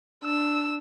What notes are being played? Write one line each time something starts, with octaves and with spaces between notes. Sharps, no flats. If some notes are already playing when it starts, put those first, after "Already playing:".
D4 E6